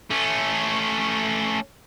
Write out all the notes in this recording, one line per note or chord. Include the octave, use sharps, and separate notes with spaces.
A3 C#4